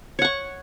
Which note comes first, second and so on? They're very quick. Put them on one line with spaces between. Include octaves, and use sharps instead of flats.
C#5 F#5 C#6